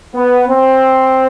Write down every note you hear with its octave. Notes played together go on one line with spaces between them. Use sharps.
B3
C4